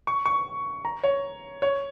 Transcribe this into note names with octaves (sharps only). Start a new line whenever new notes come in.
C#6
C#6
A#5
C#5
C#5